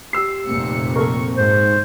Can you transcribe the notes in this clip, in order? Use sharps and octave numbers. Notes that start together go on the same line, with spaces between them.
G4 E6 C7
F1 A#2 C4 C#7
A4 A#4 C#6
G#2 C5